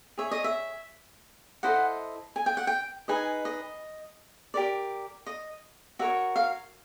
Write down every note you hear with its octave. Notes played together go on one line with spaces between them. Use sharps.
G#4 C#5 E5
D#5
E5
E4 A4 C5 D#5 F#5
G#5
G5
F#5
G5
D#4 G#4 B4 D#5 G#5
D#5
G4 A#4 D5
D#5
F#4 A#4 C#5 E5
F5